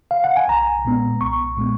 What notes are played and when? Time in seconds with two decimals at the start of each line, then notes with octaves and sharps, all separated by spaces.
0.11 F5
0.24 F#5
0.37 G#5
0.48 B1 A#5
0.85 A#2 G#3 B3
1.21 B1 C#6
1.57 A#2 G#3 B3